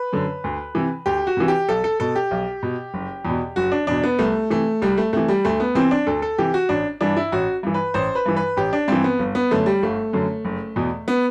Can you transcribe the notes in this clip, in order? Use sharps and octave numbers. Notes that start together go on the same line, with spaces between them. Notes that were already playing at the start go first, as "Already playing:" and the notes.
Already playing: B4
F#2 D3
D2
C3 E3
D2 G4
F#4
C3 E3
G4
B1 A4
A4
B2 A4
G4
B1
B2
F#1
E2
B2
F#1 F#4
D4
E2 B2 D4
B3
C2 A3
C3 E3 A3
C2 G3
A3
C3 E3 A3
G3
D2 A3
B3
C3 E3 C4
D4
D2 A4
A4
C3 E3 G4
F#4
A1 D4
G2 E3 D4
E4
A1 F#4
G2 E3
B4
A1 C5
B4
G2 E3
B4
A1 G4
D4
G2 E3 C4
B3
G1
B3
F#2 D3 A3
G3
G1 A3
F#2 D3
F#1
E2 B2
B3